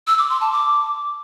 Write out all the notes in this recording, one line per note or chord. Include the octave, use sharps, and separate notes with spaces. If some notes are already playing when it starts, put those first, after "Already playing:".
E6
D6
C6
A5
D6